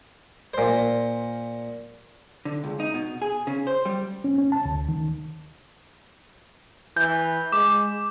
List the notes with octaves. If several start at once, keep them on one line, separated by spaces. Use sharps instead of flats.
A#2 C5
D3
C#2
D#4
B2
G#4
C#3
C5
G3
C#4
C#4
A5
D2
D#3
E3 G6
G#3 D6